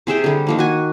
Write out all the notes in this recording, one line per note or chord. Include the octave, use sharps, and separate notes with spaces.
C3 G#4 E5 G5
D3 G3
D#3 F3 A#3
F#4 G#5